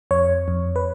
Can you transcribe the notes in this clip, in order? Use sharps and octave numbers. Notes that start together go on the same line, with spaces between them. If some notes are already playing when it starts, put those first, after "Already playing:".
F2 C#5
F2
B4